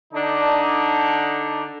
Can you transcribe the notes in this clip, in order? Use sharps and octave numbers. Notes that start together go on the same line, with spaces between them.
D3 D4 D#4